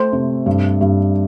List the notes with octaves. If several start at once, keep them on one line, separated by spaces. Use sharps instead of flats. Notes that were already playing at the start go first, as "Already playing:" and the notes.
Already playing: A3 C5
C3
G2
G2